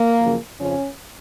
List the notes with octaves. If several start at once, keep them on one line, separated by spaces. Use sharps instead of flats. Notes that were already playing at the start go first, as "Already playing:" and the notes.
Already playing: A#3
F#2 C#3 F3
F2 C#3 F3 C#4